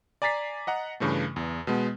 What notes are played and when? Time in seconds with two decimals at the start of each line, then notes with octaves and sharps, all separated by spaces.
0.22 D5 G#5 A#5 A6 B6 C7
0.67 D#5 F#5 A#5
1.00 G2 C#3 E3 A3
1.36 E2
1.67 B2 G#3 B3